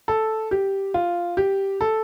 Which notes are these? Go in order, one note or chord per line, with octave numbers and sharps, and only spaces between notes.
A4
G4
F4
G4
A4